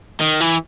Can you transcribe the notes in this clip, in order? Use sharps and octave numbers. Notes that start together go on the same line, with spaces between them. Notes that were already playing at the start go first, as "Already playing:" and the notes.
D#3
E3